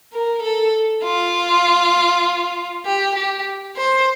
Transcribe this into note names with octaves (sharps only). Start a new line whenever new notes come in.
A#4
A4
F4
G4
G4
C5